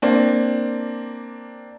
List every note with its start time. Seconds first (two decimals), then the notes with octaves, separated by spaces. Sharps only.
0.02 A#3 C4 D4